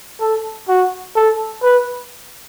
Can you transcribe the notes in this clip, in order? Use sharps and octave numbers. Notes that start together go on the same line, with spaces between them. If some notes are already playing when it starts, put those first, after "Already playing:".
A4
F#4
A4
B4